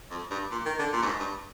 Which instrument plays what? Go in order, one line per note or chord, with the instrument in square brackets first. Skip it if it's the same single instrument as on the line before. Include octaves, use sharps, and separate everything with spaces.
[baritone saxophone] F2
G2
A#2
D#3
D3
A#2
G2
G#2
G2